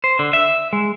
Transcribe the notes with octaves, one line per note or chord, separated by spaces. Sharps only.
C5
D3
E5
G#3